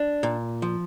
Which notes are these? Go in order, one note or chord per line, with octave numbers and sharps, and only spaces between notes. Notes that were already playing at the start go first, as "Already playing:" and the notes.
Already playing: D4
A#2
F3